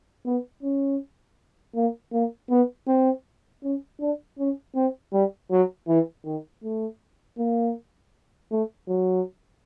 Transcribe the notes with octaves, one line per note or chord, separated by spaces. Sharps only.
B3
C#4
A#3
A#3
B3
C4
C#4
D4
C#4
C4
G3
F#3
E3
D#3
A3
A#3
A3
F#3